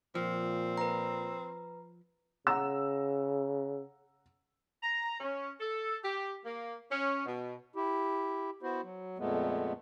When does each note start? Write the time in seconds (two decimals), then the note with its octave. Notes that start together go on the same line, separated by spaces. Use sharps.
0.15 A#2 F3 C4
0.77 B4 A#5
2.47 C#3 F#5 A#5 E6
4.83 A#5
5.20 C#4
5.60 A4
6.04 G4
6.46 A#3
6.92 C#4
7.26 B2
7.76 E4 G4
8.63 B3 E4 F#4 C5
8.83 F#3
9.19 F2 A#2 G#3 A3 B3